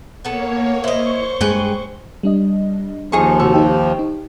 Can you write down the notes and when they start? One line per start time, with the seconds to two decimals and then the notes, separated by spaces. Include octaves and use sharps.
0.25 A#3 B3 A4 C#5
0.84 E4 C5 D#5 C#6
1.41 G2 G#3 G#4 B4 G5
2.23 G3 D4 D#5
3.12 D#2 F3 D#4 G#4 C#6
3.40 C3 F#4 C#6 E6
3.54 D#4 G4 G5
3.99 D#4